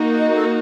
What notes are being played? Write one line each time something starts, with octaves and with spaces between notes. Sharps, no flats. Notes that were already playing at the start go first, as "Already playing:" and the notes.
Already playing: A#3 D#4 F#4
D#5
A4
A#4